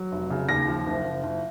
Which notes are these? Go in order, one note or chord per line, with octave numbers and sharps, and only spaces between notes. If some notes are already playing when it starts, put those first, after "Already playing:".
Already playing: F#3
F1
C#3
D#2 A#6
F3
F#1
F#1
F#1